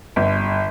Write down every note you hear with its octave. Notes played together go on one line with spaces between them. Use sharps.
G1